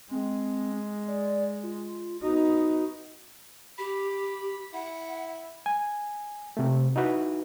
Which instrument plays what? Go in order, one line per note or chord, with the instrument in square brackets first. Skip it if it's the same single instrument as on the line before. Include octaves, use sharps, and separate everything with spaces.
[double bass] G#3 [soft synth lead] C4
[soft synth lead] D5
F4
[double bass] B3 D#4 [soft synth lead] F#4
[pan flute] G4 [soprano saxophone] B5
[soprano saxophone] E4 [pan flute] F#5
[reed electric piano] G#5
C3 A3
D#4 E4 F#4 B4